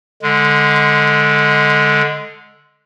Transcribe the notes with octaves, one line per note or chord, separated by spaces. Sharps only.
D3 G#3